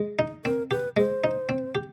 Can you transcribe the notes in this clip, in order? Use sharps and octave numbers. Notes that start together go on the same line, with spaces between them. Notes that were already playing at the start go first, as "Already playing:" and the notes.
Already playing: G#3
D#4
C4 A#4
G4 B4
G#3 C5
D#4
C4
G4